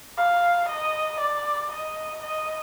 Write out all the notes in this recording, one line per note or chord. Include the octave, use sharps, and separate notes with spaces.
F5
D#5
D5
D#5
D#5